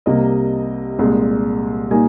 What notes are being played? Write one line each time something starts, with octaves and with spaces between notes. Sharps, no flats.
C2 C3 G3 A#3 D#5
C2 A#2 G#3
A#2 G3 A#3 D#4 G#5